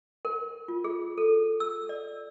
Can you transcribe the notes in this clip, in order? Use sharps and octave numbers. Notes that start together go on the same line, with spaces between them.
A#4
F4
G#4
A4
E6
D5